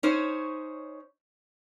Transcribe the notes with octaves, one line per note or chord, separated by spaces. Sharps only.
C#4 D#4 C5 C#5